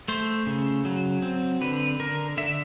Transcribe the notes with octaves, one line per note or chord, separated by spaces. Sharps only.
A3 C5
C#3
F#3
C4
D3 B4
D3 A#4
D3 E5